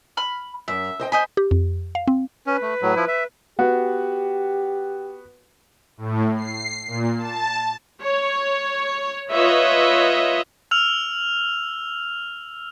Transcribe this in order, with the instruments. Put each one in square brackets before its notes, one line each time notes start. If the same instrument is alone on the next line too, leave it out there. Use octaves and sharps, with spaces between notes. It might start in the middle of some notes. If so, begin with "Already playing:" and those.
[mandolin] B5 F6
[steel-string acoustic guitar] F#2 [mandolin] E5
[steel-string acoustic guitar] C5 D#5 G5
[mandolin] C5 D#5 B5 [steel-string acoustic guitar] G#5
[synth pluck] G4
F2
F5
C4
[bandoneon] C#4 [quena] B4
[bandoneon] A3
A2 F#3
F3 E4
E5
[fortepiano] B3 F#4 [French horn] G4
[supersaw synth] A2
C7
A#2
A5
[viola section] C#5
F4 B4 C#5 D#5 E5
[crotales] E6 F6 F7